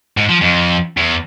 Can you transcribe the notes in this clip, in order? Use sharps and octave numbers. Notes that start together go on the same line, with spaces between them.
G#2
F3
F2
E2